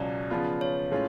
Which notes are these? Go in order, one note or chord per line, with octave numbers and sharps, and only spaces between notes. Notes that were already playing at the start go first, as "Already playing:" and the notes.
Already playing: C#2 B2 F#3 C#4 D5
C#3 F3 B3 F4
C#5
A2 G#3 C#4 F4